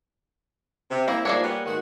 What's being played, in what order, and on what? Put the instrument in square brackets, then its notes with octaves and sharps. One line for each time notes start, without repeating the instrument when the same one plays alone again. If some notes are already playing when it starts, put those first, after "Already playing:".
[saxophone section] C3
[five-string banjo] A#3 [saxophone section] C4 E4
[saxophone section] G#2 F3 D4 [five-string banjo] A#3 G#4 C#5
[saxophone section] G3 B3
G#2 D#3 F#4